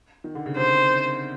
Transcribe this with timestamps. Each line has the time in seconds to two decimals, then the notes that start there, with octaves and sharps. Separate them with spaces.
0.24 D#3
0.35 D3
0.46 C#3
0.57 C3 C5